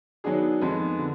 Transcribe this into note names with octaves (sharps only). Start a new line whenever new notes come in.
D#3 F#3 B3 D4 G#4
F2 D#3 G#3 B3
D3